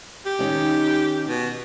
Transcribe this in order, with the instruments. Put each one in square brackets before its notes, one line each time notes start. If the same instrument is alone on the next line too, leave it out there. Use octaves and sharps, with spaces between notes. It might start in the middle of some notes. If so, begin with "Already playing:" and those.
[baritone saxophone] G4
[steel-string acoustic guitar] D#3 C#4 D#4
[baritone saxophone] B2